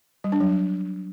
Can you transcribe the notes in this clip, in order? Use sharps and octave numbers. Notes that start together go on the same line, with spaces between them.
G3
D4
F#3